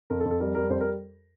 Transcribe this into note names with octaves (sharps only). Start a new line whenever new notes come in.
F2 A#4
A4
F2
A4
G3 A#4
G3 A#4
F2 C5
A#4